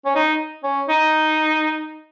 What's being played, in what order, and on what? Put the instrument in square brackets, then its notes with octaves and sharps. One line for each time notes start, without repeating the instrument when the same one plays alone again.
[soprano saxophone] C#4
D#4
C#4
D#4